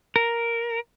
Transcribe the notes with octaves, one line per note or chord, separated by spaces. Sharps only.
A#4